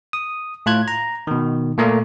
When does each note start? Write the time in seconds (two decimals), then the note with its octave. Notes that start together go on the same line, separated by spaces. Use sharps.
0.13 D#6
0.66 A2 F4 F#6 G#6
0.88 A#5
1.27 B2 D#3
1.78 A#2 A3 A#3